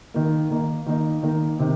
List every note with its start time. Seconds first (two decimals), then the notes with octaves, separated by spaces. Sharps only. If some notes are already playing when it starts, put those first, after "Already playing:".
0.14 D#3 A#3 D#4
0.50 D#3 A#3 D#4
0.86 D#3 A#3 D#4
1.23 D#3 A#3 D#4
1.59 C3 D#3